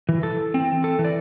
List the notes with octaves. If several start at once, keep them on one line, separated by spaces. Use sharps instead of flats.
E3
A4
C4
A4
E3
D5